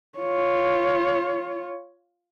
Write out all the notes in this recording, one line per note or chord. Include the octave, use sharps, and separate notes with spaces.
F4 C#5